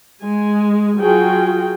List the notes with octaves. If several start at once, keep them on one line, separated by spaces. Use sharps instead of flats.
G#3 G#5
F#3 F4 F#4 G#4 G5